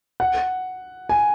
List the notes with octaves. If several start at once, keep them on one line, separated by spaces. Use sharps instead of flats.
F#5
G#5